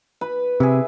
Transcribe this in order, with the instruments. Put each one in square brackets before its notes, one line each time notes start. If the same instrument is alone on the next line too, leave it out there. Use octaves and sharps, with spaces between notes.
[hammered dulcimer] B4 B5
[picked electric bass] C3 [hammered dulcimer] E4 G#4